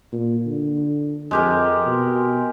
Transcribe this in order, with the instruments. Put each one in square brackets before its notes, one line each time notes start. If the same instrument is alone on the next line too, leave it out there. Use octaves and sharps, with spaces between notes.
[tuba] A#2
D3
[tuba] F2 [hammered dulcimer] G#3 G4 A#4
[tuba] B2